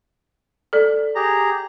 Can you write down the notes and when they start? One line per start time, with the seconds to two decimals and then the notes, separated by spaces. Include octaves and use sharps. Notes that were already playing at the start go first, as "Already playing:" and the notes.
0.73 A4 D5
1.15 G4 G#4 A#5